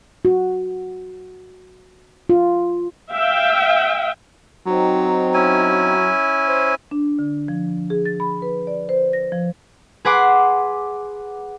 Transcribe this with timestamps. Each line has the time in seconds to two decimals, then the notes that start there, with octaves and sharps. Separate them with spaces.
0.25 F#4
2.29 F4
3.12 E5 F5 G5
4.66 F#3 C4 D#4
5.34 C#4 E4 G#5
6.48 C5
6.91 D4
7.19 D3
7.48 F3
7.90 G#4
8.05 A6
8.20 B5
8.42 B4
8.67 D5
8.89 C5
9.13 A#6
9.32 F3
10.05 G#4 B4 F#5 C6 D6